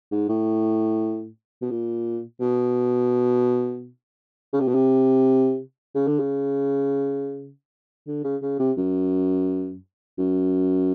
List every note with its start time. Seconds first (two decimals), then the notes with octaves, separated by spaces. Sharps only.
0.12 G#2
0.29 A2
1.62 B2
1.71 A#2
2.41 B2
4.53 C#3
4.61 C3
4.68 B2
4.75 C3
5.95 C#3
6.07 D3
6.19 C#3
8.07 D3
8.24 C#3
8.42 C#3
8.60 C3
8.77 F#2
10.19 F#2